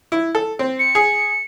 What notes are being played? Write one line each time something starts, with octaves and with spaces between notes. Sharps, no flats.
E4
A4
C4
C#7
G#4